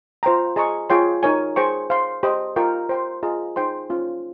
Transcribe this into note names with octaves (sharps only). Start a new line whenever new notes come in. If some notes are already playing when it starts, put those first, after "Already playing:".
F4 C5 G5 A#5
G#4 D#5 A#5 C#6
F4 G#4 C#5 G5 C6
D#4 A#4 C#5 G#5
G#4 C5 G5 C#6
C5 F5 C6
G4 C5 D#5
F4 A#4 D#5 G5 C#6
C5 G5 C6
F4 G#4 D#5 A#5
D#4 G#4 C5 G5 C6
C#4 F4 C5